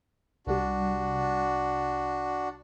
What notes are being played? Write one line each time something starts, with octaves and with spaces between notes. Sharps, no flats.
C2 G3 D4 F#4